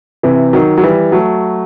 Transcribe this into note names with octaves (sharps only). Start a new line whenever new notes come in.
C3 E3
D#3 F#3
F#3
E3 G3
F#3 A3